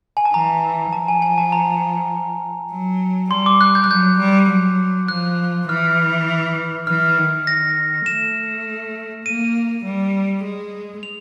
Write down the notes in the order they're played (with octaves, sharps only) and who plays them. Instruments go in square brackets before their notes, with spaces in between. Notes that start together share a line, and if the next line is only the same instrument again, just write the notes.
[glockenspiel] G#5
A5
[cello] E3 [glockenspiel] A#5
[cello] F3 [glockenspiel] A5
[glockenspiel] G#5
G#5
A5
A#5
[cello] F#3
[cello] G3 [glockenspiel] C6
[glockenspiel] D6
F#6
G6
F#6
[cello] F#3 [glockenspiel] G6
[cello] G3
F#3
[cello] F3 [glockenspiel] F#6
[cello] E3 [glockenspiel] F6
[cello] E3 [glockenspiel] F6
[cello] D#3
[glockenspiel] A#6
[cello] A3 [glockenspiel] E7
[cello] A#3 [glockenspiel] D#7
[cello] G3
G#3
[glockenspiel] F7